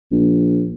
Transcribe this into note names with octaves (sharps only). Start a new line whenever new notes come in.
A#1